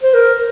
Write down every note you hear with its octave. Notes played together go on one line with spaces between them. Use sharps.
C5
A#4